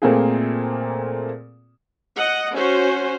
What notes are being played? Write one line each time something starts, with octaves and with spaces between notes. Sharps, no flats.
A#2 A3 A#3 C4 F4 G#4
D#5 F#5
C#4 F#4 C5